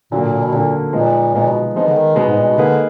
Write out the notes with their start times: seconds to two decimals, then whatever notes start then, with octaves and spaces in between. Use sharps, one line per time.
0.11 A#2 D3 F#3 A#3
0.22 A#2
0.32 A#2
0.42 B2
0.52 A#2 D3 F#3 A#3
0.93 A#2 F3 G#3 B3 D#4
1.34 A#2 F3 G#3 B3 D#4
1.48 B2
1.75 F3 G#3 B3 D#4
1.88 D3
1.96 D#3
2.16 B2 G#3 B3 D#4
2.27 G#2
2.37 A#2
2.47 B2
2.57 D3 A#3 D#4 G#4 B4